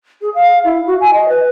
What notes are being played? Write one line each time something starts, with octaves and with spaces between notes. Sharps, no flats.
G#4
F5
E4
F#4
G#5
D#5
B4